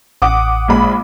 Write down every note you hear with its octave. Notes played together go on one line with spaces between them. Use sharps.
A1 F#5 D6 D#6
A#1 G#3 B5